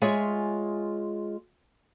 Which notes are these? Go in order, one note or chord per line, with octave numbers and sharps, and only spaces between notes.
G#3 F4 G#4 C#5 E5 G#5